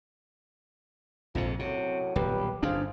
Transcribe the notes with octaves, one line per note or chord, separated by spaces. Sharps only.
A#1 F2 G#2 C3
F#2 A2 C3 F#3
D#1 B1 G4 B4
G1 F#2 D4 G#4 C5 F5